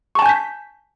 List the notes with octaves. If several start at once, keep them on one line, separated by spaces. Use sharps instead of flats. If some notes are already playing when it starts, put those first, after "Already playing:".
G#5 A5 C#6 G6 B6